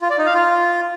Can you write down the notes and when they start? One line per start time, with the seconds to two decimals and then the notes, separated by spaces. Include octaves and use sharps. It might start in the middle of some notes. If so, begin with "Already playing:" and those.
0.02 F4
0.10 D5
0.18 D#4
0.26 F5
0.34 F4